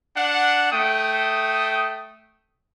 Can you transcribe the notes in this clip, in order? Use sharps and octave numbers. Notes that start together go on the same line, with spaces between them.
D4 F#5
A3 G5 D#6